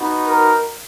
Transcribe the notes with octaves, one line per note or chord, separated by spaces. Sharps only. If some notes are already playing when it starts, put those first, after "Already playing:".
Already playing: B3 D#4 F#4
A#4